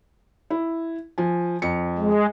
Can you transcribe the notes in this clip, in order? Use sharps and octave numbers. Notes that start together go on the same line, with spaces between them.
E4
F3 G#5
F2 C#7
G#3